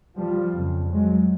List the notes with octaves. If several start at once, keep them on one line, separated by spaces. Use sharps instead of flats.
F3 G3
F2 C#3
F#3 G#3